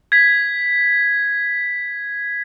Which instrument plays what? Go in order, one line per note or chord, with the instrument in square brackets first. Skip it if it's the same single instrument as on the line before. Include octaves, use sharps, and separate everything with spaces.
[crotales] G#6 B6